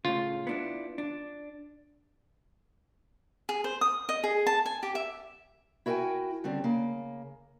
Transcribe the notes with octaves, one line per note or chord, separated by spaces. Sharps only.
A2 C#3 F4
B3 D4 E4
D4
G#4
C5
D#6
D#5
G#4
A5
G#5
G4
E5
E4 F#4 A#4 E5 G5 G#5
D3 G3 C4 C#4
C#3 A#3